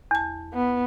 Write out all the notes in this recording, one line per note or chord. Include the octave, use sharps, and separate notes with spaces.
E2 A5
B3